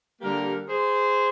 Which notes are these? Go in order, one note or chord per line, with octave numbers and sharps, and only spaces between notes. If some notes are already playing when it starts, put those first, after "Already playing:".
D3 G3 A#3 G4 A#4
G#4 C5